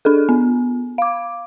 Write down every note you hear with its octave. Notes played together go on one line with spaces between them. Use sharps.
D4 G#4 A4
B3
F5 D6